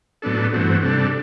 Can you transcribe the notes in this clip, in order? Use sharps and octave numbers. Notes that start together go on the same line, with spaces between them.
A2 F#3 B3 D4 A4
G2 E3 A3 C4 F#4
C3 G3 D4 A4